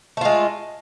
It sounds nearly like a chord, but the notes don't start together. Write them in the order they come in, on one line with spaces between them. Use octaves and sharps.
A3 F4 G#3